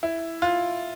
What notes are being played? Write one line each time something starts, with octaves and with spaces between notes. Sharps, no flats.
E4
F4